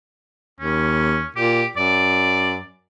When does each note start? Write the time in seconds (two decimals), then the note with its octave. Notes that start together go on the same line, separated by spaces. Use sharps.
0.60 D#2 C#4
1.36 A#2 G4
1.77 F#2 D5